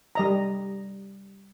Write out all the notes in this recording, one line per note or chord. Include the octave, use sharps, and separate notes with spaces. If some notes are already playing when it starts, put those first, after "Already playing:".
G3 D#5 A#5